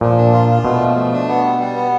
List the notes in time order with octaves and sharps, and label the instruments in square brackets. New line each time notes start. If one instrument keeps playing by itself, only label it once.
[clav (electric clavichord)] A#2 [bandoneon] F3
[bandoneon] D4
F4
F4
[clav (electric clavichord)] B2 [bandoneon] A3
[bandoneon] F3
A3
D4
B3
G3
G3
B3